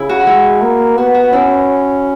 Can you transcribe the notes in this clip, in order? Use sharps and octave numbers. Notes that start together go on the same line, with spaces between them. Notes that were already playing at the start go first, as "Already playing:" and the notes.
Already playing: C#3 E4
F#4
G#3 E4
A#3
B3 F#4
F#4
C#4 E4